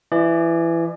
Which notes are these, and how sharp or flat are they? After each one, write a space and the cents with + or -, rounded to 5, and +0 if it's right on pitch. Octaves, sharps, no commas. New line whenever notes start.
E3 +20 D5 +40